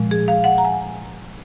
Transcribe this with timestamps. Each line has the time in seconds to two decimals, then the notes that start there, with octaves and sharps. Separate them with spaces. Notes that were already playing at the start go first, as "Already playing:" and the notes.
Already playing: A#2 F3 G#3
0.11 G#4
0.28 F5
0.44 F#5
0.58 A#5
0.65 G#5